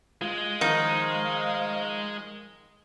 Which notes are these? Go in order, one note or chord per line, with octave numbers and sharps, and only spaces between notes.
G#3 F4
D#3 F3 D#4 C5 D#5 F5